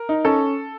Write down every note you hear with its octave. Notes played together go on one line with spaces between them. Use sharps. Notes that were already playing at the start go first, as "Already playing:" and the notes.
Already playing: A#4
D#4
C#4 A4